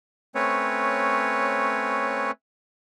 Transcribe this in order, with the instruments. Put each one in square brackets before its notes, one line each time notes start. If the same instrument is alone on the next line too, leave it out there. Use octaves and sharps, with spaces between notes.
[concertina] A3 C4 C#4 B4 C#5